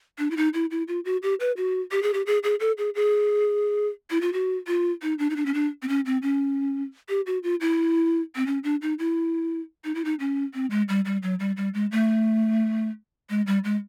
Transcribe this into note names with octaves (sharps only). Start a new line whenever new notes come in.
D4
E4
D#4
E4
E4
F4
F#4
G4
B4
F#4
G4
G#4
G4
G#4
G#4
A4
G#4
G#4
E4
F4
F#4
F4
D#4
D4
D#4
D4
C#4
D4
C4
C#4
C4
C#4
G4
F#4
F4
E4
C4
C#4
D4
D#4
E4
D#4
E4
D#4
C#4
C4
G#3
G3
G3
F#3
G3
G3
G#3
A3
G#3
G3
G#3